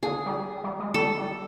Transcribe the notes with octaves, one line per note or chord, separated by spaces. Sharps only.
D3 G#4
G3
G3
G#3
G3 A4
G3